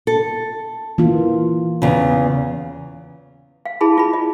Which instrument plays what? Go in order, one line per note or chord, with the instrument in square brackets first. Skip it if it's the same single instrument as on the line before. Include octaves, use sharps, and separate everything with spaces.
[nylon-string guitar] A4
[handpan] E3 A#3 F4
[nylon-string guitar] E2 C#3
[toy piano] F5
E4 G#4 A5 B5
F4 B5
D#5